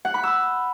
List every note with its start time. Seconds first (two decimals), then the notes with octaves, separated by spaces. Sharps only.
0.05 F#5
0.14 B5
0.23 E6